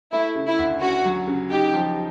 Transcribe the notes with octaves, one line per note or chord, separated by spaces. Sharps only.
A3 E4
C#3
E4
D2
C#4 F#4
F#3
C#3
D#4 G4
F3